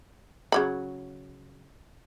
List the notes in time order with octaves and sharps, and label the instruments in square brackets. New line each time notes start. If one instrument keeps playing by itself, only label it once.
[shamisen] C#3 F#3 B5